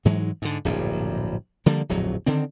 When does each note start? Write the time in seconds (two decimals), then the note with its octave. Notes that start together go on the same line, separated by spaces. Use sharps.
0.05 G#2 E3 F#3 G#3
0.42 G#2 D3
0.65 D1 A#1 G2
1.66 D3 F3 G3 A#3
1.89 D1 A#1 F2 F#3
2.26 D3 D#3 C4